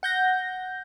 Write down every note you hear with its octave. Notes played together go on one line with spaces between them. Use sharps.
F#5 G6 A#6